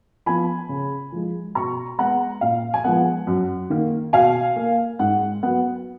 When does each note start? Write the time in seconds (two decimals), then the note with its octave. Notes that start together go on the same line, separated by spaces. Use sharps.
0.26 F3 B3 G#5 B5
0.69 C#3
1.12 F3 G#3
1.55 B2 A#5 C#6
1.98 G#3 B3 F#5 A#5
2.41 A#2 F5
2.74 G#5
2.84 F3 G#3 B3 F#5
3.27 F#2
3.70 D#3 A#3
4.13 B2 F5 G#5
4.56 A#3
4.99 G#2 F#5
5.43 F#3 B3 F#5